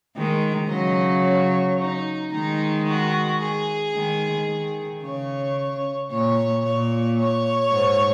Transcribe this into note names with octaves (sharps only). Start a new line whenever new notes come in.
D#3 G#3 A#4
C#3 F#3 D#5
C#5
D#4
D#3 G#3 D#4
F#4
G#4
D#3 G#3
D#3
C#3 C#5
A#2 C#5
A#2 C#5
C#5
G#2